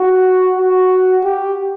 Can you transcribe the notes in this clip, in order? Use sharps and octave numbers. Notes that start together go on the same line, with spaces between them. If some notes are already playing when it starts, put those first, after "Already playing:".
Already playing: F#4
F#4
G4